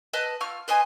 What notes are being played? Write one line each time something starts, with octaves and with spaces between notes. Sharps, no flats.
B4 D#5 A5
F4 C#6 F6
B4 C5 D#5 G#5